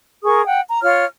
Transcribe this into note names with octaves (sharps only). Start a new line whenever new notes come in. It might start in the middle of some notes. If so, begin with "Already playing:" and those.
G#4 A#4 C#6 D#6
F#5 G5
A#5
F4 C#5 F6